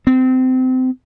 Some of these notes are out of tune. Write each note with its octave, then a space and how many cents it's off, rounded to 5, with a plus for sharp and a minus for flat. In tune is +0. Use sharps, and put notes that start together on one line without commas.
C4 -25